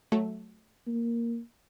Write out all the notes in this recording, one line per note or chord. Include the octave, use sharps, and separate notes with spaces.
F#3 A3
A#3